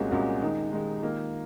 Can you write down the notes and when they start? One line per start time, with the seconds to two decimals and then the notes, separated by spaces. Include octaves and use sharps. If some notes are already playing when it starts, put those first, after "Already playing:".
Already playing: C2 A#2 G#3 C#4 F#4
0.11 C2 A#2 G#3 C#4 F#4
0.41 D#3 G#3 D#4
0.71 D#3 G#3 D#4
1.02 D#3 A#3 F4